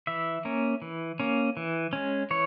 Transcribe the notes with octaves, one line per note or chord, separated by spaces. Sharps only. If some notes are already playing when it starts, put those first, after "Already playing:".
E3 E5
A#3 C#4
E3
A#3 C#4
E3
G#3 C#4
E3 C#5